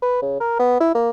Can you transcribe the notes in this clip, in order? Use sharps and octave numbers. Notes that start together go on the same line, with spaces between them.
B4
C#3
A#4
B3
E4
A#3